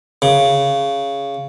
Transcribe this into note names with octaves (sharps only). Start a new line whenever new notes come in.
C#3